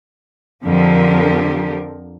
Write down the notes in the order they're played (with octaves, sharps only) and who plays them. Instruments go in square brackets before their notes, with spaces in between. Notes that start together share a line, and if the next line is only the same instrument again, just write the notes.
[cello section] F2 D3 F3 G4 A#4